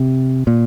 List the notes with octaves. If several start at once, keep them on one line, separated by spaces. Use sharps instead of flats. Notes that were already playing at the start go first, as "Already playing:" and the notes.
Already playing: C3
A#2